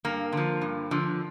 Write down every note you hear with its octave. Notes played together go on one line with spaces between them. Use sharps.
G2 A#3
D3 F3
G2
D3 F3